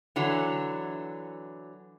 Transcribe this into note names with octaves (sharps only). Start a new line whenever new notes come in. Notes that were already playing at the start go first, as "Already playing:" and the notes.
D3 E3 F#3